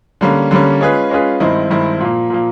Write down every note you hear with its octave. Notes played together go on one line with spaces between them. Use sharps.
D3 G3 A#3 C#4
D3 G3 A#3 C#4
G#3 C#4 F4 G#4 B4
G#3 C#4 F4 G#4 B4
G2 D#3 G#3 C4 E4
G2 D#3 G#3 C4 E4
A#2 F3 A#3
A#2 F3 A#3